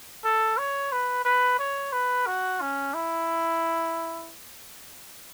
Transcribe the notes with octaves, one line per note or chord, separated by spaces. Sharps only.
A4
C#5
B4
B4
C#5
B4
F#4
C#4
E4